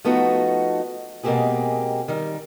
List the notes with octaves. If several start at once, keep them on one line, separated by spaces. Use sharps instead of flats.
F3 A3 B3 D#4 F#4 A4
B2 G#3 A#3 C4 G4 G#4
D#3 G3